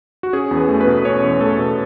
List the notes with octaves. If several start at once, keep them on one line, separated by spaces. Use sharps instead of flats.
F#4
C#4 G#4
E2
B4
A3
B4
B2
C#4 C#5
E2
A3 A4
B2